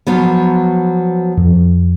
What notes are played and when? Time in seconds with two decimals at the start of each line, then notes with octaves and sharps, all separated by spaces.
0.07 F3 F#3 B3
1.38 F2